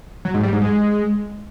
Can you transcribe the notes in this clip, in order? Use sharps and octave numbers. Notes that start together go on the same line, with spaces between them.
F#3
G#2
G3
G#2
G#3